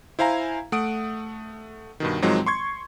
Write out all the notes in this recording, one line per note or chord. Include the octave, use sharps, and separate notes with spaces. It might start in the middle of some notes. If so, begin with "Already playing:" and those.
E4 C5 F5 G#5 A#5
A3 F#5 D#6 D7
G2 B2 D#3
G#2 D#3 F3 F#3 G#3 C4
C6 C#6 G#6